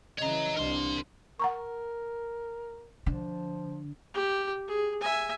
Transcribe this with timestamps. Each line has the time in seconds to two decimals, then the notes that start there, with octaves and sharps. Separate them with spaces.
0.19 C#3 E3 C#5 D#5 A#5
0.57 C2 D4 A#4 C6
1.40 A#4 F#5 A#5 C#6
3.06 D3 F3
4.14 G4
4.68 G#4
5.00 E5 G#5